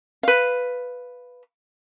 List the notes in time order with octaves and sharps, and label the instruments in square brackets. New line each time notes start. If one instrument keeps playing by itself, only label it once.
[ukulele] B4 F5